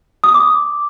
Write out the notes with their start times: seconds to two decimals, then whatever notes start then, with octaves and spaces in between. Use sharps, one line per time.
0.24 D#6
0.34 D6